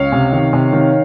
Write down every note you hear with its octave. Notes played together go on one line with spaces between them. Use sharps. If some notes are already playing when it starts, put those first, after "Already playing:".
Already playing: C#2 C#5 F5
C3
D#3
C3
D#3